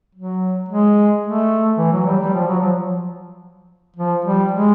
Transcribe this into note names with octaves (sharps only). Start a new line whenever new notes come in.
F#3
G#3
A3
E3
F#3
G3
G3
F3
F#3
F3
F3
G3
G#3